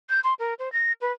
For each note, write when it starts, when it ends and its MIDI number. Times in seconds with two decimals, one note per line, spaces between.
0.10 0.20 91
0.24 0.34 84
0.39 0.54 70
0.59 0.72 72
0.72 0.92 94
1.01 1.12 71